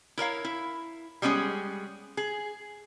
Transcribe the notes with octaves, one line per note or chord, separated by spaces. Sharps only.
E4 A#4 C#5 F5
E4
G3 G#3 B3 C#4 G#4
G#4